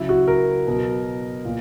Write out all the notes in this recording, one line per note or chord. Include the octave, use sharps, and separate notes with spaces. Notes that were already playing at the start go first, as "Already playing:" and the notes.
Already playing: C#3 F#3 E4
F#4
A#4
B2 F#3
A#2